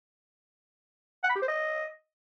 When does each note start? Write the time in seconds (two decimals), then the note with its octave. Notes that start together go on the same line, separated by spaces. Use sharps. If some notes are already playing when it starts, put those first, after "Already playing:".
1.23 F#5
1.29 B5
1.36 G4
1.42 C5
1.48 D#5